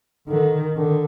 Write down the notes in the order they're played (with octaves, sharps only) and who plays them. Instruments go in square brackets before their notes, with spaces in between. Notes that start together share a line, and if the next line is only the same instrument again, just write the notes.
[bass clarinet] D3 [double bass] D#3
[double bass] D3 [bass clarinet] D#3